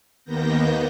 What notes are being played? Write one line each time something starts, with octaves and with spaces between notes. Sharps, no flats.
D#2 D#3 A#3 B3 G6 A#6